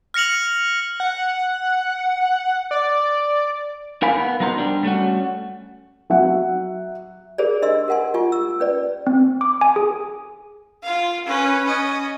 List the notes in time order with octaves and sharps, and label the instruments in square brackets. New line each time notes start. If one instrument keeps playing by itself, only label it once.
[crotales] F6 A#6 C#7 F7 F#7
[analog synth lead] F#5
D5
[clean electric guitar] D#4 A#4 F5 G#5 B5
B3
F#3 B3 D#4 A#4 C5
G3 D4
G3 A3 C#4 F#4
[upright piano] F#3 E5 F#5
[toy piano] G4 G#4 A#4 C5 D5
D4 D#5 C6 E6
G4 A#4 F#5 G#5 C6
F4 G4 G#5 C#6
E6
C#4 B4 D5
[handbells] C4
D6
G#5
G#4
[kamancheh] F4 F5
C#4 B4
C#4 D#5